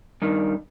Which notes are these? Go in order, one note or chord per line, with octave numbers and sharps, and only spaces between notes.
G2 D#3